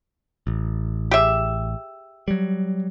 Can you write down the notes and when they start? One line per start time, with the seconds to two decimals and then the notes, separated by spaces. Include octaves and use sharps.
0.47 A1
1.11 G4 G#4 E5
2.28 F#3 G3